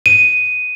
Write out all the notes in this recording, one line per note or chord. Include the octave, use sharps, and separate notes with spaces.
D#7